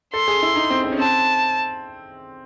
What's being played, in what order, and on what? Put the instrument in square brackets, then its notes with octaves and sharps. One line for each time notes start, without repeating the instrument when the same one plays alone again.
[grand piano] A4 [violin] C6
[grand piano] G#4
E4
D#4
C4
C4
C#4
[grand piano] C4 [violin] A5